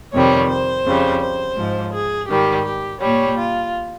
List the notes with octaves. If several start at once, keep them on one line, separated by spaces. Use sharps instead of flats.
F2 C3 D#3 G3 C#5
C5
F2 C#3 G3
C5
G#2 F3
G#4
G#2 D#3 G3 G4
G4
A#2 G3 C#5
F4